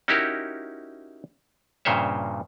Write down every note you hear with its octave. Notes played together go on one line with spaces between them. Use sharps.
C#4 D#4 E4 F#4 G4 A#4
G2 A#2 C#3 C5 C#5 E5